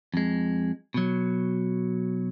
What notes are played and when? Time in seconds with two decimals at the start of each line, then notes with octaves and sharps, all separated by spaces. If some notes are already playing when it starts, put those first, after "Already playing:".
0.14 F2 G#3
0.94 B2 F#3